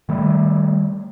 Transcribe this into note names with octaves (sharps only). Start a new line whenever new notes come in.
D#3 G3 A3